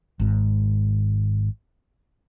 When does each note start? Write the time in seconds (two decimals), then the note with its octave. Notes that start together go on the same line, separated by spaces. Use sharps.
0.20 G#1 G#2